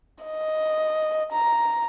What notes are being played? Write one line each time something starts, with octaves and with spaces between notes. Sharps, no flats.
D#5
A#5